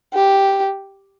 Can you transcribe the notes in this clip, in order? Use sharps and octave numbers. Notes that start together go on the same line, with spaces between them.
G4